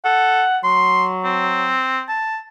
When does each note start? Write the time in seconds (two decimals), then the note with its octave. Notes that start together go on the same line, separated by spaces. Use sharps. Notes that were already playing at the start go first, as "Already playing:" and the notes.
0.05 A4 F#5
0.64 F#3 C6
1.25 C4
2.09 A5